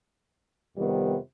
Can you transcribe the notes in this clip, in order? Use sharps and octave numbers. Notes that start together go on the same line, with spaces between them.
F2 C3 D#3 G3 B3